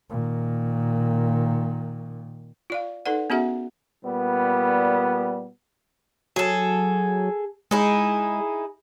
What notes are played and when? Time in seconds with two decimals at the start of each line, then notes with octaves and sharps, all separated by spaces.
0.10 A#2 D#3
2.70 F4 D5 F5
3.06 D#4 A4 B4 D5 F#5
3.30 B3 C#4 F#4 G#4 E5 F#5
4.04 A#2 G3 B3
6.36 F#3 G#4 A4
7.71 G#3 D#4 E4 G#4